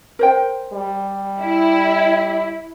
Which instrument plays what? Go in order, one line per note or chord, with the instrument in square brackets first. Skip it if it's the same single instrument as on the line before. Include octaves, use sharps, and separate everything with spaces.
[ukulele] A#4 C5 G5
[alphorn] G3
[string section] E4